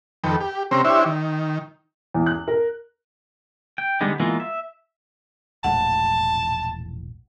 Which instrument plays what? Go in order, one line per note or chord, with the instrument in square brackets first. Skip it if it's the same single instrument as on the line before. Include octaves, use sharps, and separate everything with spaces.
[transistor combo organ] F2 D#3 A4 B4 G5
G4
C3 C4 C#4 G4 C5 A#5
D4 E4 G4 C5 C#5 E5
D#3
[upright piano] E2
F#6
A#4
[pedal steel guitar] G5
D3 G3 G#3 B3 D#4
E3 G#3 A#3 B3 F4
E5
[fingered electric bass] E1 A#1 A2 [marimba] F#5 [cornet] A5